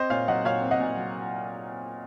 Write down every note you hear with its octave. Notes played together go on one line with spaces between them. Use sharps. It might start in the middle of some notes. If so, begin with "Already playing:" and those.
Already playing: C4 C5 D#5
A#2 C#5 F5
F#3 D#5 F#5
A#2 C#5 F5
C4
D#5 F#5
A#2
F#3